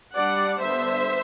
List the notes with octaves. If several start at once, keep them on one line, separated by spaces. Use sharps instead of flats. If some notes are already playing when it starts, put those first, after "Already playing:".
G3 D4 D5 F#5
D3 G3 B3 C5 E5